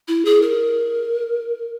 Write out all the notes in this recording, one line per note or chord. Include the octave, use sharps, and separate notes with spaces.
E4
G#4
A#4